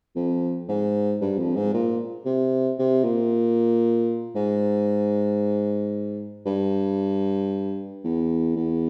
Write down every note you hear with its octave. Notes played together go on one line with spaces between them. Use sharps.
F2
G#2
G2
F2
G#2
A#2
C3
C3
A#2
G#2
G2
E2
E2